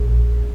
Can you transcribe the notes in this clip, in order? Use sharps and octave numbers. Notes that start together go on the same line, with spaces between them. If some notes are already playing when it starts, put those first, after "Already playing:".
Already playing: A#1